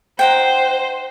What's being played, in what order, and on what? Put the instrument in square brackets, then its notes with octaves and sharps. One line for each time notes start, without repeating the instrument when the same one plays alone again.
[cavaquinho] D#4 F#5 G5 [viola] C5